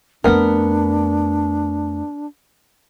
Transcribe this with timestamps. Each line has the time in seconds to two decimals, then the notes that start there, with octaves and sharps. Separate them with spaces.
0.24 F2 A3 B3 D4 A#4